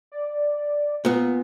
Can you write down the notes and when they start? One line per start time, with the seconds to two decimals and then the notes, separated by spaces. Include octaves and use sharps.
0.12 D5
1.05 A#2 B3